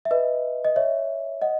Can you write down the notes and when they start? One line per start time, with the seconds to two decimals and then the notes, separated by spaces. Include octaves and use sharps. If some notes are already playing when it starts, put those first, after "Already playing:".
0.05 E5
0.11 B4 D#5
0.65 D#5
0.76 C#5 E5
1.42 D#5 F#5